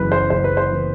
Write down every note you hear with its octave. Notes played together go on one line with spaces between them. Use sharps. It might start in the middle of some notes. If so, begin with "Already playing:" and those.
Already playing: F#1 F#2 E3 B3 B4
C5
F#1 C5
B4
C5
E3 B3